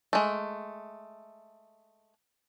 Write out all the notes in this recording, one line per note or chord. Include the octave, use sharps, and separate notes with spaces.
G#3 A3